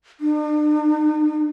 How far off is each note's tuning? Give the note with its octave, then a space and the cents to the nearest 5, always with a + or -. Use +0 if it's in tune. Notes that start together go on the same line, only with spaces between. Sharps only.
D4 +40